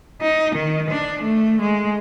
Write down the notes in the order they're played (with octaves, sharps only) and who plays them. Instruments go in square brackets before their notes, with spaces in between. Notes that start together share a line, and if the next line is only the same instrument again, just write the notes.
[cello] D#4
D#3
D4
A3
G#3